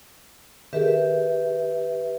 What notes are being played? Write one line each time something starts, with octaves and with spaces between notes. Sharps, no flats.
D#3 G4 G#4 A#4 B4 E5